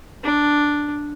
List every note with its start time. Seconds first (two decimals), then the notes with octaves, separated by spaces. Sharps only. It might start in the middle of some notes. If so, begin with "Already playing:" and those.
0.24 D4